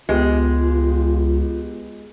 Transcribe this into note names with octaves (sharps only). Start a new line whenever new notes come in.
C#2 G#3 B3 F4 G4